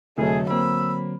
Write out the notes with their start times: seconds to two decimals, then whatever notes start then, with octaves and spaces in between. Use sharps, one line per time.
0.18 F1 D3 F#3 A3 G#4
0.50 A#3 C4 B5 E6